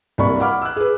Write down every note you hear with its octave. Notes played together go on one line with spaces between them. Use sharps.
C2 A#3 D5 B5 C#6
F5 F#5 B5 D6 F6
E6 F#6
G#4 B4